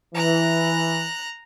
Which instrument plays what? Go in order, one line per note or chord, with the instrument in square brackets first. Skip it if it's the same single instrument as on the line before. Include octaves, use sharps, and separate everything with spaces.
[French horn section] E3 [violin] A#5 F#6